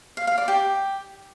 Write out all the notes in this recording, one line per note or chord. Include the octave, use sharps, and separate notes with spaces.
F5
F5
D5
G4